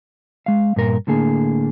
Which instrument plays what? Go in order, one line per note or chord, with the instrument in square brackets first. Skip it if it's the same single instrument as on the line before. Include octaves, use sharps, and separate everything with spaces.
[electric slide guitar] G#3 F5
G2 A#2 A#4
A2 D3 A#3 G#4